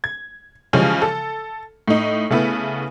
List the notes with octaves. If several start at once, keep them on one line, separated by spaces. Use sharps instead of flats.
G#6
C#3 E3 F3 G3 G#3 C#4
A4
A2 D#4
C#3 A3 B3 E4